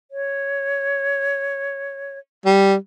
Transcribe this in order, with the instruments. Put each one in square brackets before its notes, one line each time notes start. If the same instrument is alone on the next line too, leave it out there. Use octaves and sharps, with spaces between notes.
[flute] C#5
[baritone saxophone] G3